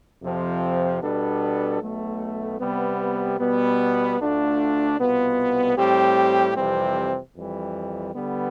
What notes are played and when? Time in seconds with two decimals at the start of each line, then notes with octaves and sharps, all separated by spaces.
0.22 F2 C3 F3 C4
1.02 B2 G3 B3 D4 A4
1.82 B1 B2 A3
2.60 C3 G3 B3
3.40 B2 G3 B3
4.18 D2 D3 A3 D4 F4
4.98 C2 B2 B3 F4
5.77 A2 G3 C4 G4
6.57 F2 C3 E3 G3 C4
7.36 F2 E3 G3
8.15 D3 G3 B3